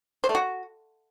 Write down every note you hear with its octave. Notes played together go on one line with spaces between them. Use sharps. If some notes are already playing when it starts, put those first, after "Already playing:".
C5
A3
F#4